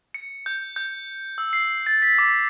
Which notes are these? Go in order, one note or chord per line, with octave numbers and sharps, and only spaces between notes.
C#7
G6
G6
E6
C7
A6
B6
D6